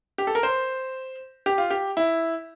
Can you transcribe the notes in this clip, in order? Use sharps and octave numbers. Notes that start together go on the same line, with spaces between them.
G4
A4
A#4
C5
G4
F4
G4
E4